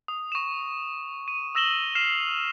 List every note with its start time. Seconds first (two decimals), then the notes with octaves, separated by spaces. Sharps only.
0.08 D#6
0.32 C#6 E7
1.28 D#7
1.55 D#6 E6 A#6 E7 F#7 G7
1.95 F6 C7 E7 F7